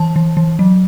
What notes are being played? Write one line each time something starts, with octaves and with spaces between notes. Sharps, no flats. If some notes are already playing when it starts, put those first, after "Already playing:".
Already playing: E3 A5
E3
E3
F#3